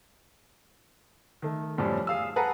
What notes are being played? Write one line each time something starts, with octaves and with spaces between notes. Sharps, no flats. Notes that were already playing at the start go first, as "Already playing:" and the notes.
D#3 A3
F#2 A2 F3 G3
G#4 F5 E6
G#4 A4 B4 F#5 A5 A#5